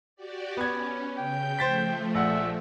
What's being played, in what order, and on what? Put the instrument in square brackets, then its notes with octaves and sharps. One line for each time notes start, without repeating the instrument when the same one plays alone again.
[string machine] F#4 G4 D5
[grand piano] B3 G#6 [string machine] C#4
[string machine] C#3 G6 [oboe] G5
[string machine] F3 A3 [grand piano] C5 A6 B6
[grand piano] A#1 F#5 [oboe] E5